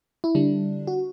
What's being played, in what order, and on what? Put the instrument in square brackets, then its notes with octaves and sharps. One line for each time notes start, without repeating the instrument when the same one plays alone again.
[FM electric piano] E4
D3 G3 D4
F#4